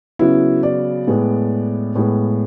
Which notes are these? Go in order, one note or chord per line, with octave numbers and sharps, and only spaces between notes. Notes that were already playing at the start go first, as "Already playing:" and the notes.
C#3 F#3 B3 E4
D5
A2 G#3 B3
A2 G#3 B3